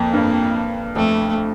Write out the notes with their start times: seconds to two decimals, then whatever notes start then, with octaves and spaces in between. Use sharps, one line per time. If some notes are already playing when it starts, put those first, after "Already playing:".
Already playing: F2 A#3
0.13 G2
0.96 F2 A3